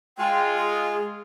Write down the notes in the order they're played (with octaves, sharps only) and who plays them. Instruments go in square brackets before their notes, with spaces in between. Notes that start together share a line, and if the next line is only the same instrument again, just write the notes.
[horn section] G#3 F4 [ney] G5
[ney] G#4